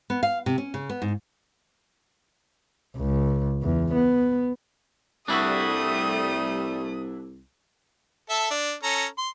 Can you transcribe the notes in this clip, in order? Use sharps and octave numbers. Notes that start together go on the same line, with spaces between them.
B3
F5
C3
C#4
C#3
B3
G#2
C#2
E2
B3
C2 G3 A3 D4 E4 F#4 D#6
A4 E5 A5
D4
C#4 A4 A#5
C6